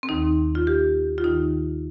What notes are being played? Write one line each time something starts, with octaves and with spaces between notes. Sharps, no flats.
C4
D#2 D#3 D#4
F4
G4
F4
D#2 D#3 D#4